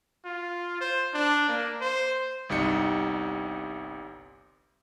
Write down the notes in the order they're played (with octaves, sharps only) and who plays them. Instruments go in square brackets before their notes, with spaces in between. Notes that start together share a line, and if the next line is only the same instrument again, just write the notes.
[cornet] F4
C5
D4
A#3
C5
[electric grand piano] G1 C2 G3 D#4 C#7